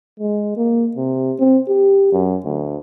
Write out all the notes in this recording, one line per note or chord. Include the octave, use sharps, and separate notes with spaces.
G#3
A#3
C3
C4
G4
F#2
D2